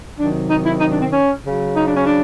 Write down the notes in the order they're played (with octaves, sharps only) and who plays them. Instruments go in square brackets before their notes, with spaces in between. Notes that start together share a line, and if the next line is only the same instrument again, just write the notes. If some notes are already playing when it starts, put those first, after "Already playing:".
[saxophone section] C3 D#3 F#3 D4
D#4
E4
D#4
D4
C4
C#4
C#3 F#3
D#4
D4
C#4
D4